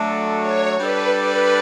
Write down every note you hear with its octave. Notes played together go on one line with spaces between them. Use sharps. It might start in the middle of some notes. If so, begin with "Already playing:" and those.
Already playing: F#3 A3 D4 F#4 A4
C#5
G3 D4 A4 B4 D5
B4